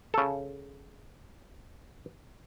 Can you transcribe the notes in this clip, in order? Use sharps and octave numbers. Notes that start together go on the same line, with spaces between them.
C#3 A4